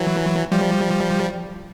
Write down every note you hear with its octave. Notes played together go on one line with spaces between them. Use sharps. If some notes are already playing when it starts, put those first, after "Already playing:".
Already playing: E3 F#3
F3 G3